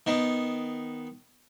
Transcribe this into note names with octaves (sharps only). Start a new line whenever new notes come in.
D#3 B3